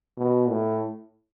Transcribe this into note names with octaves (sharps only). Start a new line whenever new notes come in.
B2
A2